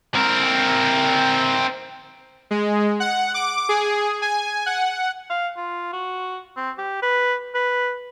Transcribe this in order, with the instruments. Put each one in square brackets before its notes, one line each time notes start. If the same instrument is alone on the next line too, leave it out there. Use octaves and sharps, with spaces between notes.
[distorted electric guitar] C4 A#4
[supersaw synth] G#3
F#5
D6
G#4
G#5
F#5
[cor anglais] F5
F4
F#4
C4
G4
B4
B4